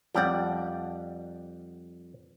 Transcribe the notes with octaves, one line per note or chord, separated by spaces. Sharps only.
F2 G3 G4 D5 F#5